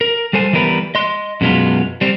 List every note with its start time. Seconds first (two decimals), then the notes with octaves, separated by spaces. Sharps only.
0.01 A#4
0.33 G3 A4 C5 G#5
0.53 E3 G3 B3 A#4 B4
0.95 D#5 C6
1.41 F#2 B2 G#3 B3 F4
2.01 G3 C4